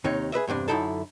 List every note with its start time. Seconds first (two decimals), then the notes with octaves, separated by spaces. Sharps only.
0.04 D#2 C3 D#4 C#5
0.32 G#4 B4 D#5 E5
0.47 E2 G2 C3 D4
0.68 F#2 D3 D#4 E4 A4 A5